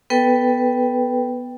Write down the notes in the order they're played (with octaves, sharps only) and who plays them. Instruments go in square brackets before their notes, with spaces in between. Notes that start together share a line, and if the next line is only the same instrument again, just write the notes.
[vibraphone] B3 A4 B4 G5